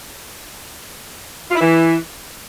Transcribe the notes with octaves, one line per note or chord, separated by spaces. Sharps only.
F4
E4
E3